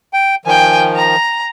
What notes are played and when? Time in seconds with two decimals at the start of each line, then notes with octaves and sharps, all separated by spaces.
0.13 G5
0.45 D#3 F3 G5 G#5
0.96 A#5